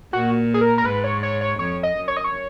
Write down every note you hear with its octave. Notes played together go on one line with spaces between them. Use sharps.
A#2 F#4
G#4
A#4
A#4
G#2 B4
C#5
C#5
C#5
F2 C#5
D#5
F#2
C#5
D#5
C#5